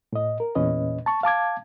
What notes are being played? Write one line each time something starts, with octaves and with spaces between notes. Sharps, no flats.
A2 D#5
A#4
E2 A#2 C#4 B4 D#5
A5 C#6
F5 A5 D6 G#6